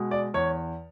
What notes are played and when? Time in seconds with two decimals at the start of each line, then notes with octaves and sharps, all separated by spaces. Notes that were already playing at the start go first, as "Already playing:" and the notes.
Already playing: B2 G#3
0.11 D5
0.34 E2 C#5